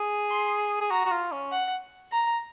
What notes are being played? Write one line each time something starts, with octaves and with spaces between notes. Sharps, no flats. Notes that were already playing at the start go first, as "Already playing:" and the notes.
Already playing: G#4
C6
G#4
F#4 A#5
F#4
F4
C#4
F#5
A#5